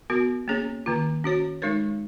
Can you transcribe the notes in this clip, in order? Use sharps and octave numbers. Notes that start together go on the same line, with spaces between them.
B3 F#4 A#4
A#3 C#4 G#4 C#5
D#3 A#3 F4
C#4 F#4 C#5
G#3 D#4 A#4 C#5